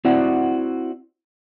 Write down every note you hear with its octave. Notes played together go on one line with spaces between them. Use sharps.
C4 E4 F#4 D5 F#5